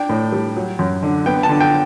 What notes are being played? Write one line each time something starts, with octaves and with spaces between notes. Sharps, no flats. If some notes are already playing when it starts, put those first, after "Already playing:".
Already playing: D4 G5
A2
G3
F#3
F#2
D3
B3 G5
A5
D3
G5